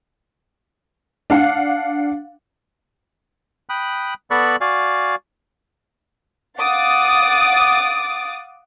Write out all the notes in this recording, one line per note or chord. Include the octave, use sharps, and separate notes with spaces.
D4 F5 F#5
G5 B5 D#6 F#6
B3 A4 D5 B5 C#6 F#6
F#4 D5 F5 G#5
F5 F#5 D6 D#6 A6